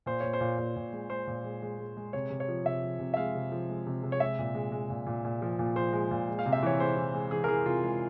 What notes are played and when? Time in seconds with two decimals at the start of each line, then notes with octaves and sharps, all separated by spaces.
0.06 A#2 C5
0.21 A#2 C#5
0.33 C5
0.41 A#2
0.59 A#2
0.76 A#2
0.93 G#3
1.10 G#3 C5
1.27 A#2
1.44 G#3
1.62 G#3
1.79 G#3
1.97 G#3
2.13 C3 C#5
2.30 C3
2.40 C#5
2.48 F3
2.65 C3 E5
2.83 F3
3.00 C3
3.14 E5
3.17 G#3 F5
3.35 C3
3.52 F3
3.70 G#3
3.87 C3
4.03 C3
4.12 C#5
4.20 G#3 E5
4.39 A#2
4.55 G#3
4.72 G#3
4.90 A#2
5.07 A#2
5.25 A#2
5.42 F3
5.59 A#2
5.76 F3 C5
5.93 G#3
6.11 A#2
6.29 G#3
6.39 F5
6.46 C3
6.53 E5
6.63 E3 C#5
6.80 G#3 C5
6.97 E3
7.14 G#3
7.31 E3 G#4
7.44 A#4
7.48 E3 G#4
7.66 C3 F4
7.84 G#3